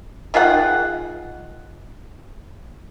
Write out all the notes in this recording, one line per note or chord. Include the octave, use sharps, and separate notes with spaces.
D#3 F4 G#4 F#5